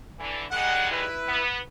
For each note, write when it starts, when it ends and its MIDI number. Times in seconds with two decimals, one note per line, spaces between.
0.19 0.44 50
0.19 0.44 52
0.51 1.04 51
0.51 1.04 55
0.51 1.04 56
0.51 0.88 78
0.91 1.42 64
0.91 1.42 71
1.29 1.58 59